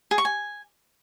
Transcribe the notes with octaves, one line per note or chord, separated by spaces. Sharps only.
G#4
C#6
G#5